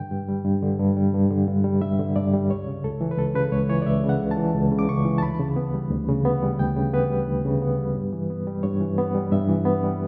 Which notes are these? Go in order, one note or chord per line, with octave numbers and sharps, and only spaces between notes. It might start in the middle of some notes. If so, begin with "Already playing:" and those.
Already playing: G2 D3 G5
G2
G3
G2
D3
G2
G3
G2
D3
G2
G3
G2 E5
D3
G2 D5
G3
C#2 C#5
C#3
C#2 A4
E3
B4
C#2 A4
C#3 B4
C#2 C#5
E3 C#5
D5
C#2 E5
C#3
F#5
C#2
A5
E3
C#2
C#3
D6
C#2 C#6
E3
A5
D2 B5
C#3
B3
G3
D2
C#3
B3
G3
D2 G5
C#3
B3 B4
G3
D2
C#3
B3
G3
G2
E3
B3
G3
G2 C#5
E3
B3
G3
G2 E5
E3
B3
G3